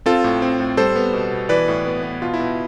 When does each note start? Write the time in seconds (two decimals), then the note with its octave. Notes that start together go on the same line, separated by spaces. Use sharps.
0.06 C4 F4 A4
0.24 A2
0.42 C4
0.60 A2
0.77 G3 A4 C5
0.96 B3
1.13 B2
1.31 B2
1.49 E3 B4 D5
1.68 A2
1.86 B3
2.03 B3
2.22 B2 F4
2.34 E4
2.40 B2